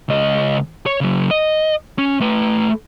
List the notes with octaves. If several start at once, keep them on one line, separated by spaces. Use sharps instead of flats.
C#2 D#5
C#5
C#3 F#3
D#5
C#4
A3 B4